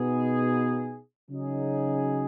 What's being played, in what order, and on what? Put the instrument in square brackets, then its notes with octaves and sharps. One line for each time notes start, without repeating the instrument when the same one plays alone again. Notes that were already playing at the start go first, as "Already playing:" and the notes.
Already playing: [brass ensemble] B2 B3 D#4 G#4
C#3 F#3 D#4 G#4